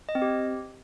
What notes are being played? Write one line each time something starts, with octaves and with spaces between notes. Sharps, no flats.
D#5
C4
G4